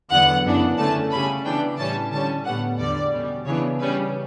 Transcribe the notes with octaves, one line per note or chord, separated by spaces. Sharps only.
E2 D3 F#3 B3 F#5
F#2 C#3 E3 B3 D4
D3 A3 C#4 A5
C#3 G3 C#4 B5
C#3 E3 B3 D4 G5
A2 E3 G3 C#4 A5
D3 G3 C#4 A5
A2 G3 B3 F#5
E2 D3 G3 D5
B2 G3 C#4
C#3 E3 B3 D4 C#5
C#3 G3 C#4 B4